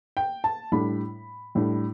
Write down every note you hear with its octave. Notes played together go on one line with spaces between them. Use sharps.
G5
A5
A2 G3 D4 B5
A2 G3 D4